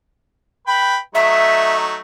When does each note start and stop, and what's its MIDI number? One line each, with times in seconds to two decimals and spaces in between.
0.67 0.97 71
0.67 0.97 79
0.67 0.97 83
1.15 1.98 54
1.15 1.98 57
1.15 1.98 63
1.15 1.76 76